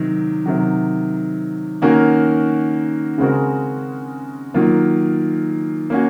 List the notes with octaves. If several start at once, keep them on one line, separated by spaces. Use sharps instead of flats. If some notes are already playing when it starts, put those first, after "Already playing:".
Already playing: C3 D#3 F#3
C3 D#3 F#3
D#3 A#3 C#4 F#4 A#4
C#3 G#3 C4 F#4 A#4
D#3 F#3 A#3 F4
A#3 C#4 F#4